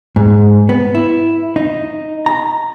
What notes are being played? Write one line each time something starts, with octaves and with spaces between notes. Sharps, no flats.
G#2
B3
E4
D#4
A#5